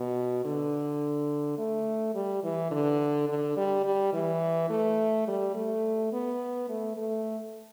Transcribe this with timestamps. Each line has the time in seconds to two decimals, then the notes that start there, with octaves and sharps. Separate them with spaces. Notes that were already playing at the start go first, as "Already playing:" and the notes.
Already playing: B2
0.45 D3
1.58 A3
2.15 G3
2.44 E3
2.71 D3
3.29 D3
3.57 G3
3.85 G3
4.13 E3
4.70 A3
5.28 G3
5.55 A3
6.13 B3
6.69 A3
6.97 A3